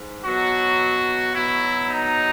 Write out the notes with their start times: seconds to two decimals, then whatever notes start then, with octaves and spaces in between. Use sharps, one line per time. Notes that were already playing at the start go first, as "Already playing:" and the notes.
Already playing: G#2
0.25 B2 F#3 F#4
1.35 B2 F#3 E4
1.90 D#4